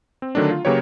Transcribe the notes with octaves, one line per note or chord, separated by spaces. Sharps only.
C4
D3 D#3 F#3 A3 D4
F4
C#3 F#3 A#3 G4 B4 C#5